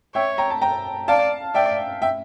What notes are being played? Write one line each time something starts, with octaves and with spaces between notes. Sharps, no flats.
C#5 E5 G5
G5 A#5
A5
G5 A#5
D5 F5 A5
D5 E5 G5
E5 G5